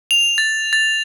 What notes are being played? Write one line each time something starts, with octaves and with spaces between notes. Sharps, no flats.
F7
A6
A6